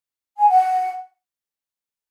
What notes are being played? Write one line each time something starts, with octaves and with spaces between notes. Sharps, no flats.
G#5
F#5